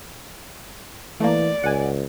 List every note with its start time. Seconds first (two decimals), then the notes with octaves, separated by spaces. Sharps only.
1.20 E3 A3 A#3 D5
1.64 C#2 F#5 G#5